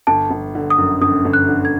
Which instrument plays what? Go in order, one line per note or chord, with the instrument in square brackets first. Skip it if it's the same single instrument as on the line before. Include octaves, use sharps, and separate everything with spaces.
[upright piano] G1 [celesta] A5
[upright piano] G1
D3
[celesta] D#6
[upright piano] F#2
[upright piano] G1 [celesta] D#6
[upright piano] G1
[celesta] F#6
[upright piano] D3
[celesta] G#6